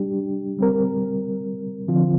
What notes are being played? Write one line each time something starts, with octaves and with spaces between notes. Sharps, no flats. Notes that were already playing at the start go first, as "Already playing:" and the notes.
Already playing: G3 D4 G4
G3 C4 A#4
D3 F3 C4 F4